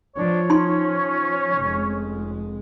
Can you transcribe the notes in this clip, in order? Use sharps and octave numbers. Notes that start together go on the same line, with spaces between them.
F3 D4 C#5
C#4 D#4 C6
F1 G#3